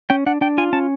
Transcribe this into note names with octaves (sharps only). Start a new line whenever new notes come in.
C#4 G5
D4 F#5
D4 G5
F4 G#5
C#4 A5